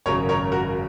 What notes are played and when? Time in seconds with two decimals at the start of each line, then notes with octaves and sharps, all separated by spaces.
0.06 G#1 F#2 C#3 A#4 C#5
0.29 A#4 C#5
0.52 F#4 A#4